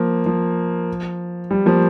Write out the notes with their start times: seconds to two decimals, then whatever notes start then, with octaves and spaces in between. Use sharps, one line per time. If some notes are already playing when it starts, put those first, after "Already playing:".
Already playing: F3 A#3
0.26 F3
1.51 G3
1.66 F3 A#3